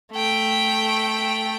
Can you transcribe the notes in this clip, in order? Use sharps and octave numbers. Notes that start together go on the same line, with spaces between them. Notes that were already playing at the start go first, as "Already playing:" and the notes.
A3 G5